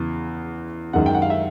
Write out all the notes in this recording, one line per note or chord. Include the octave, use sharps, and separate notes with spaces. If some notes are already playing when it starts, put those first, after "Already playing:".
Already playing: E2 C#3 E3
F#2 D#3 G#3 F#5
G5
F#5
F5
E5